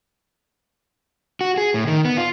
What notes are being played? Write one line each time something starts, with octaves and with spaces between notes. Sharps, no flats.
F#4
G#4
A2
D#3
B3
F4